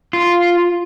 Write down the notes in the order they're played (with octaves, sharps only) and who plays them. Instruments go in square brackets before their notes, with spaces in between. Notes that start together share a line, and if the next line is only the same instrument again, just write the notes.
[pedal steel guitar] F4